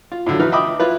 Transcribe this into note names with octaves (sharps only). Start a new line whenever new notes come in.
F4
A2 D3 F#3
B2 E3 D#4 B4 F6
D#5 E5 G5 B5 D6 D#6
E4 F4 B4